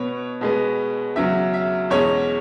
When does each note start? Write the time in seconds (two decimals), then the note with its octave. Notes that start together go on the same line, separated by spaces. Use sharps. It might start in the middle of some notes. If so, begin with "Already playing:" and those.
Already playing: B2 B3 C#5
0.41 B2 G#3 B3
1.16 E2 C#3 F#3 E5
1.54 E5
1.90 E2 B2 G#3 C#4 C#5